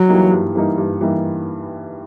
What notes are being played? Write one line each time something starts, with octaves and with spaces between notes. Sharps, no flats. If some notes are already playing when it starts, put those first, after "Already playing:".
Already playing: F#3
E3 G3 A#3 D#4
G2
E3 G3 A#3 D#4
G2
E3 G3 A#3 D#4